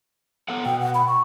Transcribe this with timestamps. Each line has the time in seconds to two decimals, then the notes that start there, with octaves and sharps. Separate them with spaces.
0.49 B3 A4 F#5
0.66 B2 G5
0.80 F#5
0.95 B5
1.08 C#6